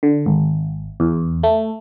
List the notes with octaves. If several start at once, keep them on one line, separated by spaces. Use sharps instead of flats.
D3
G#1
E2
A3